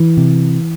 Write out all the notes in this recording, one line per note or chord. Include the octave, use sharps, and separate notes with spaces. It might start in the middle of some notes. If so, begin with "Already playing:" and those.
Already playing: E3
C3